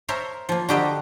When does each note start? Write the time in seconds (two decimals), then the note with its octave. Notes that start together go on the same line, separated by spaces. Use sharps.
0.09 A#4 C5 C#5 E5 A5 A#5
0.49 F3 A#3
0.69 D3 F#4 G4 A#4 D#5 A5